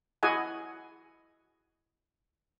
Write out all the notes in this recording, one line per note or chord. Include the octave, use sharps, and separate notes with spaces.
E4 F#4 G#4 D#5 F#5 G#5